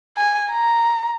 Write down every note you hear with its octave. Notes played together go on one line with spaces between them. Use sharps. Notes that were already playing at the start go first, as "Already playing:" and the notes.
G#5
A#5